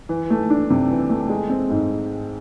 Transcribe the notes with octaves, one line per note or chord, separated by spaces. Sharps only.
E3
A3
D4
C3
E3
A3
G#3
C4
G#2